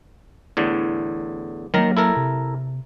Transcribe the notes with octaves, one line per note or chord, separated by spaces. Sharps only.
E2 A2 D3
D#3 F#3 G3 A#3 A#4 A#5
E4 A4 A#4
C3